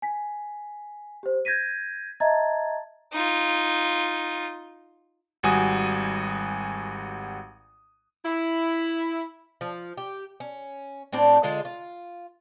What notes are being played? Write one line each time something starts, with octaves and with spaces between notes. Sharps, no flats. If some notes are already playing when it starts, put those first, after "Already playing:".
G#5 B6
G4 C5
G6 G#6 A#6 B6 D#7
D#5 E5 A5 A#5 G#6 A6
D#4 F4
G#1 G3 F#4 G#5 D#6
E4
F3
G4
C#4
A2 C4 D4 G4
D3 G#3 F4
F4